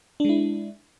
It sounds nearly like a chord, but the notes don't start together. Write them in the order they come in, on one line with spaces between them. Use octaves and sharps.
D4 G#3 E4